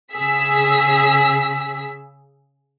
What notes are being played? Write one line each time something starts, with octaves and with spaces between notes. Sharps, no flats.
C#3 G#4 E6 B6